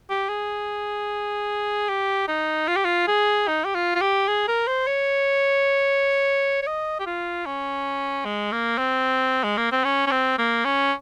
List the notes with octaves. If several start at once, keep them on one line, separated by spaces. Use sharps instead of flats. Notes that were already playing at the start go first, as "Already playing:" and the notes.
G4
G#4
G4
D#4
F4
G4
F4
G#4
D#4
G4
F4
F4
G4
G#4
A#4
C5
C#5
C#5
D#5
G4
F4
C#4
G#3
A#3
C4
G#3
A#3
C4
C#4
C#4
C4
A#3
C#4